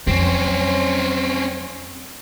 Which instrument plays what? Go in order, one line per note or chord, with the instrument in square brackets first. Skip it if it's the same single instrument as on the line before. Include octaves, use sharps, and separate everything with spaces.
[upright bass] F2 F#3 [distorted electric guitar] C4 C#4